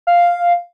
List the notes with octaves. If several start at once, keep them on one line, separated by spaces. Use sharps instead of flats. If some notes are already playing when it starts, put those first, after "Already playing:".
F5